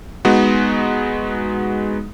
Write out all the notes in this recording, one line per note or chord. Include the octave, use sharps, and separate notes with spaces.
G#3 B3 D#4 F#4